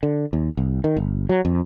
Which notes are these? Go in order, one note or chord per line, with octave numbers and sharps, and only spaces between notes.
D3
D#2
C2
D#3
G1
F#3
F2